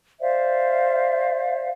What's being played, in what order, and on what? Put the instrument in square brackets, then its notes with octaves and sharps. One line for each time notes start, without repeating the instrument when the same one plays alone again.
[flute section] C5 D5 E5 F5